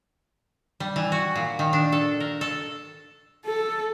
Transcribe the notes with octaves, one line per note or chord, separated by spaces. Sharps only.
G3
E3
F#4
A#2
D#3
D4
A4
A#4
A4
A4